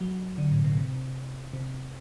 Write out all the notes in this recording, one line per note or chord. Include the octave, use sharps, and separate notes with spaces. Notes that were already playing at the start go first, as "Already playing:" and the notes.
F#3
D3
A2
B2
C3
C3